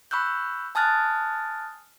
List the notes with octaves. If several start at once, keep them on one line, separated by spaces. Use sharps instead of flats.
B5 C#6 E6 F#6 G6
G#5 A5 D#6 F6 F#6 A6